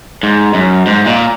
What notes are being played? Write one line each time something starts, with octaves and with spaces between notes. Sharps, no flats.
G#2
F#2
G#2
A#2